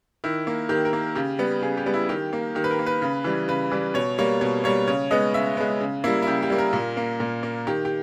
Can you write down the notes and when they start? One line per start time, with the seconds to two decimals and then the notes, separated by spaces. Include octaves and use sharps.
0.24 D#3 E4
0.47 A#3
0.69 D#3 G4
0.85 A#4
0.93 A#3
1.15 C#3 G4
1.39 G3 B3
1.62 C#3 G#4
1.77 G4
1.86 G3 B3
1.94 E4
2.09 D#3 G4
2.33 A#3
2.55 D#3 G4
2.64 B4
2.71 A#4
2.79 A#3
2.86 B4
3.02 C#3
3.24 E3 G3
3.48 C#3 B4
3.72 E3 G3
3.94 B2 C#5
4.18 G3 A#3 C#5
4.41 B2 C#5
4.64 G3 A#3 C#5
4.87 C#3 C#5
5.11 G#3 B3 D#5
5.34 C#3 E5
5.57 G#3 B3
5.81 C#3
6.04 G3 A#3 E4
6.22 E4
6.27 C#3 G4
6.43 G4
6.50 G3 A#3
6.58 A#4
6.73 A#2
6.97 A#3
7.20 A#2
7.43 A#3
7.67 D#3 G4
7.85 G4